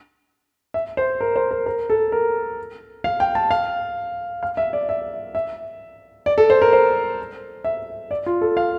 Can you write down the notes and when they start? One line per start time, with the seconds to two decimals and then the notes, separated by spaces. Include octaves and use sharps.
0.74 E5
0.97 C5
1.21 A#4
1.36 C5
1.51 A#4
1.66 A#4
1.90 A4
2.12 A#4
3.04 F5
3.20 G5
3.35 A5
3.51 F5
4.43 F5
4.57 E5
4.73 D5
4.89 E5
5.35 E5
6.26 D5
6.38 A4
6.50 C5
6.62 A#4
6.73 C5
7.64 E5
8.11 D5
8.26 F4
8.41 A4
8.57 F5